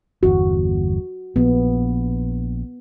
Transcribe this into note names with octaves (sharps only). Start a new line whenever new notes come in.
G1 E2 F#4
A#1 B3